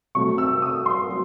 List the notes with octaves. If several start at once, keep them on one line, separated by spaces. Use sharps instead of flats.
C3 F#3 A3 C#6
E6
D#6
C6
F#3